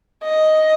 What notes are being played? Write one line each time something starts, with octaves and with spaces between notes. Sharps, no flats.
D#5